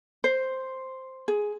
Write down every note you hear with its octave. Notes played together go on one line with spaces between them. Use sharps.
C5
G#4